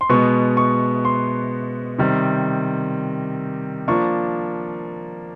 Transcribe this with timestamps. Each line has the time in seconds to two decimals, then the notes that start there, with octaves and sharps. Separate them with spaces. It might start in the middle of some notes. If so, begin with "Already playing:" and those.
0.01 C6
0.09 B2 G#3 B3 C#6
0.57 C#6
1.05 C6
1.98 C3 D#3 G3 C4
3.88 F3 A#3 D4 C#6